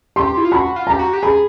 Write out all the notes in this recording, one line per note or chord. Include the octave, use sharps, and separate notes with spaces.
G4 C6
E4
F4
F#4 B5
F4
G4 A#5
F#4
G4
G#4 B5